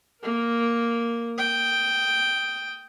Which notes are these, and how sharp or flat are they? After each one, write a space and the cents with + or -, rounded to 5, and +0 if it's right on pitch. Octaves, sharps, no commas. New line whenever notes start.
A#3 +0 A#4 +0
G5 +0 D#6 +15